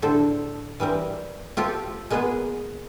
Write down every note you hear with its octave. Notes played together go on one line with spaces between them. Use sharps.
A2 D3 A4 C5
E3 G3 C4 A#4
C4 F4 G4 A4
G#3 A#3 B3 G#4 B4